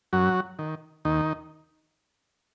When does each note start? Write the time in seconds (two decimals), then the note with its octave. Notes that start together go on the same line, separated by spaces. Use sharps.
0.13 F#2 F#3 F#4
0.59 D#3
1.05 D#2 D#3 D#4